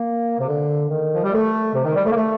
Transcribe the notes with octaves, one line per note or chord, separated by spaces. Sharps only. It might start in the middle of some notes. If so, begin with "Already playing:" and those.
Already playing: A#3
C3
D3
D#3
F3
G3
A3
C3
D#3
G3
A3
A#3
A3